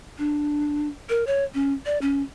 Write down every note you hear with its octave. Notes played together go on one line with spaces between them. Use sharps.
D4
A#4
C#5
C#4
D5
C#4